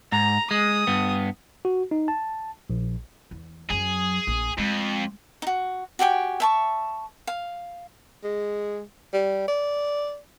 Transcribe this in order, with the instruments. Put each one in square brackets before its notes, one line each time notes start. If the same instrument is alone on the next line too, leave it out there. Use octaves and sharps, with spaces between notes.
[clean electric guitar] G#2 [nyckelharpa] A#5
[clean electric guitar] G#3 [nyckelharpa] D#6
[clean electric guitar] G2 B3
[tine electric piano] F#4
D#4
A5
A#1
[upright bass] E2
[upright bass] F#2 F#3 [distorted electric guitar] G#4
[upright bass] A#1
[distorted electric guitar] F2 [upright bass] G#3
[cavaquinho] D#4 F#4
F#4 G4 G5 G#5
E5 A5 C#6
F5
[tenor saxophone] G#3
G3
D5